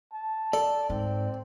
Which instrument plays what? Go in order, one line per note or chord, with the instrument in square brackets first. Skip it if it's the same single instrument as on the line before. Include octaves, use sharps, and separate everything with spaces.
[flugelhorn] A5
[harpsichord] A4 [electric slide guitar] D5
[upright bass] G#2 [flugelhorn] C4